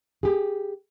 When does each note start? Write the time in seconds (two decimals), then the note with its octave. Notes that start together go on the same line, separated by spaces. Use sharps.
0.23 G4 G#4